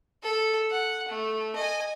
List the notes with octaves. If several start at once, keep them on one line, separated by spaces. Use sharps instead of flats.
A4
F#5
A3
D#5 G#5